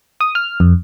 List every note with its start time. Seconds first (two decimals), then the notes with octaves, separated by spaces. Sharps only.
0.21 D#6
0.35 F6
0.60 F2